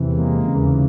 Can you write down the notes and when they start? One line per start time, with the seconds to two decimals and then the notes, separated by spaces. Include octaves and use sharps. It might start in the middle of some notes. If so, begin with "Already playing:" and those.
Already playing: E2 C3 E3
0.12 G#3 A#3
0.41 D#2 C#3 E3